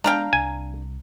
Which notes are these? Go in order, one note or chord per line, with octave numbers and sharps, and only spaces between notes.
G#3 B3 D4 F5 G5 A#5
C2 G#5